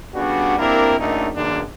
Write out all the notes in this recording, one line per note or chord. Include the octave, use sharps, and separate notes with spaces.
C#3 G3 B3 D4 F#4
A#3 C4 D4 E4 G4 A#4
C#2 F#2 A3 A#3 D4 D#4
B1 F#2 D#3 G#3 A#3 D4